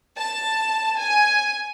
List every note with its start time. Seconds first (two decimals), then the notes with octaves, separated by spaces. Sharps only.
0.17 A5
0.98 G#5